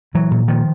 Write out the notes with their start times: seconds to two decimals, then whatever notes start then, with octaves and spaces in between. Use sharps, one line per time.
0.14 A#2 E3 F#3
0.31 A#2
0.48 A#2 D#3 F3